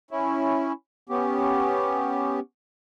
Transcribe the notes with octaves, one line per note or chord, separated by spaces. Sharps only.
C#4 E4
B3 C#4 G4